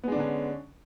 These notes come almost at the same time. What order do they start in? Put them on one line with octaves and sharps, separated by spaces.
B3 G#3 D4 D3 C#4